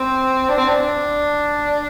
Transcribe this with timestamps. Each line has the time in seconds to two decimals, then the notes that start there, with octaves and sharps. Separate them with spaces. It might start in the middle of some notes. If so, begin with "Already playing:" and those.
Already playing: C4
0.49 D4
0.58 C4
0.68 D4